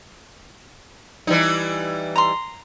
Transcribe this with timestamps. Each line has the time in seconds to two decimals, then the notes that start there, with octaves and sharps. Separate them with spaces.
1.27 E3 G3 D#4
2.16 A#5 C6